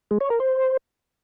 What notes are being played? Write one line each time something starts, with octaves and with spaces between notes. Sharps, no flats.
G#3
C#5
A#4
C5